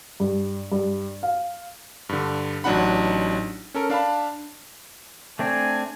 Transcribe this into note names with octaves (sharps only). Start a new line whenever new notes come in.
G2
G2
F5
G2 D3
A1 F#3 D4 D#4 F#5 B5
C#4 A4 A#4
D4 F5 A5 B5
A3 C4 D4 G#5